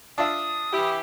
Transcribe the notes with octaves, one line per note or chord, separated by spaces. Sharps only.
D4 F4 E5 D#6
E3 E4 G4